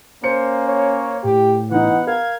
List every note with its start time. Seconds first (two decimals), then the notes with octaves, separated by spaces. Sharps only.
0.24 A#3 C#4 C5 C#7
0.67 C#5
1.24 A2 G4
1.71 E3 B3 D#4 F#5
2.07 A#4 F5 G#6